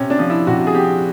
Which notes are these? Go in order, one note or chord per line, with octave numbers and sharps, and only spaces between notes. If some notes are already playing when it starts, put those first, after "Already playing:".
Already playing: C3 C#4
D4
F3
E4
C3 F#4
G#4
F3 G4